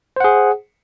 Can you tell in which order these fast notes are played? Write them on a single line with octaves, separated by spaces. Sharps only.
C5 F#5 G#4